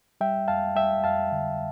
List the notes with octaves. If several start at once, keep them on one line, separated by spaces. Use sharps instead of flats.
G3 E5 G5
F2 F5 A5
G3 E5 G5
F2 F5 A5
D3